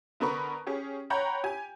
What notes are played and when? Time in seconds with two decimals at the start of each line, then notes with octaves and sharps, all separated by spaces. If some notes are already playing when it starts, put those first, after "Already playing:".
0.20 D3 B3 A#4 B5 C#6
0.67 C#4 G4 G#4
1.10 C#5 F#5 G5 A#5 B5 G6
1.44 G4 G#5